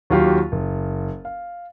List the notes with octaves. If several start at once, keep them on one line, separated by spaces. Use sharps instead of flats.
D#2 F#3 F4 G4 F5
F#1
F5